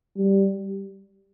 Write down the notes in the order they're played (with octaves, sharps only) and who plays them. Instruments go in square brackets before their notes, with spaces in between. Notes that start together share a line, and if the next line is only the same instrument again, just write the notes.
[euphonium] G3